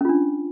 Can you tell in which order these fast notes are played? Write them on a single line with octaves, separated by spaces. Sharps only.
C#4 F4 D4